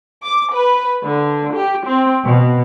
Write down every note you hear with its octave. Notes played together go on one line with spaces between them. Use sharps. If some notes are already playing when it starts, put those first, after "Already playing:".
D6
B4
D3
G4
C4
B2